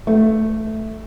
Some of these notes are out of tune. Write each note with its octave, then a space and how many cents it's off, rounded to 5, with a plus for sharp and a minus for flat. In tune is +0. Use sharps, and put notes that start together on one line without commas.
A3 -5